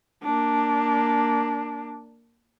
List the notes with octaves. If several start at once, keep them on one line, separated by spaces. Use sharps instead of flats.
A#3 D4